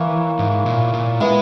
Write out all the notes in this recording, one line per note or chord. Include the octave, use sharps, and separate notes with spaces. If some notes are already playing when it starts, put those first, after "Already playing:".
Already playing: E3 A#3 E4 C#5
G#2
A#2
A#2
G#3 B3 E4 B4 E5